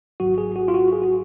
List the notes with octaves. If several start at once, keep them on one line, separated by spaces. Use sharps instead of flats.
G#1 G#2 F#3 F#4
G#4
F#4
F4
F#4
G#4
F#4